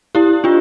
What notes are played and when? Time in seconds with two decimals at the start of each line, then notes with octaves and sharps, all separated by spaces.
0.15 E4 G4
0.44 D4 F4